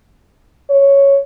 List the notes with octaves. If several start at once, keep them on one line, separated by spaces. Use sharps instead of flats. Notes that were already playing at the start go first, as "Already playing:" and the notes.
C#5